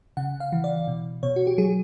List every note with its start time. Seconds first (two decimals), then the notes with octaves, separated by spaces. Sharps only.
0.17 C#3 F#5
0.40 F5
0.52 E3
0.64 D5
0.88 B2
1.23 B2 C#5
1.36 F#4
1.47 G4
1.58 F#3 G#4